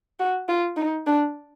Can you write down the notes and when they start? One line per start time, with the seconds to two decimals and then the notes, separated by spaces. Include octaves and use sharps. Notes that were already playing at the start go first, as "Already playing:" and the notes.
0.19 F#4
0.48 F4
0.77 D#4
1.07 D4